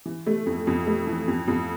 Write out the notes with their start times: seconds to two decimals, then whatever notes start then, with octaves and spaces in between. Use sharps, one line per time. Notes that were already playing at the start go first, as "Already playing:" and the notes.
0.05 E3
0.26 A3
0.46 F2
0.67 F2
0.87 A3
1.07 E3
1.28 F2
1.48 F2